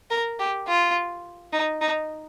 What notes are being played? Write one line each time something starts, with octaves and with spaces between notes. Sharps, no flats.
A#4
G4
F4
D#4
D#4